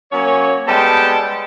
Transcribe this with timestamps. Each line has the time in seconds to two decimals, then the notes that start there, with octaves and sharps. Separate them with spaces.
0.12 F#3 A#3 C#4 C#5
0.68 G3 G#3 B3 A4 G5 A5